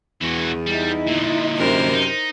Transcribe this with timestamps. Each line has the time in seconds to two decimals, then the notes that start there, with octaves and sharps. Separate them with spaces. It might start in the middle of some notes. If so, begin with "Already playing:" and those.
0.21 E2 E3 F#4
0.66 G3 D#4 E4
1.07 A#2 D3
1.57 F#2 C3 A#4 C5
1.93 D#4